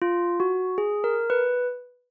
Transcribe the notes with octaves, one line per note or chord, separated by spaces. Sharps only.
F4
F#4
G#4
A#4
B4